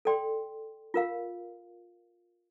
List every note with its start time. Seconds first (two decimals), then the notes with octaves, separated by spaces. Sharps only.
0.05 A4 D5 G5 C6
0.94 F4 A#4 F5